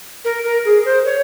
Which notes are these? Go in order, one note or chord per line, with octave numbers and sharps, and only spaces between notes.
A#4
A#4
G#4
C5
C#5